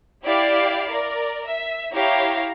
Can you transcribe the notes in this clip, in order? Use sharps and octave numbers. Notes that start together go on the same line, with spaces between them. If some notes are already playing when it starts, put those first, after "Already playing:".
E4 G4 D5 F5
A#4 D5
E5
E4 G4 C#5 F5 A#5